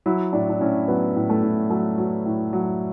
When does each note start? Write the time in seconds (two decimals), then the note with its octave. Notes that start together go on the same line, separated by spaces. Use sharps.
0.06 F#3 E4
0.33 A2 D4
0.50 D4
0.60 A2 C#4
0.88 F#3 B3
1.16 A2
1.30 A3
1.43 A2
1.70 F#3 A3
1.98 F#3
2.26 A2
2.53 F#3